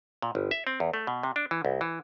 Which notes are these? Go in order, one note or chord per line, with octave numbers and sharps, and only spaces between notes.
A#2
G1
E5
C4
E2
A3
B2
C3
D4
E3
C2
E3